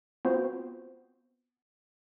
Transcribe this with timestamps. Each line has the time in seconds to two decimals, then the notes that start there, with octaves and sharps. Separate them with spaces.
0.25 B3 C4 F4 F#4 C5